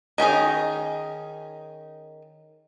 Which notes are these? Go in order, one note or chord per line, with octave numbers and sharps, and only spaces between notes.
D#3 C#4 D#4 G#4